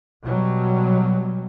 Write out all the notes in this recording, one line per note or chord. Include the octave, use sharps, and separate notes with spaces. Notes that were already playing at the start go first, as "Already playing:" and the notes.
B2 F#3 G3